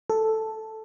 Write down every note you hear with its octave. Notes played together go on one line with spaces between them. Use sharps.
A4